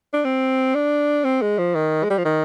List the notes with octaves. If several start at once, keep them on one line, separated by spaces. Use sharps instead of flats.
D4
C4
D4
C4
G#3
F3
D#3
G#3
G3
F3
D#3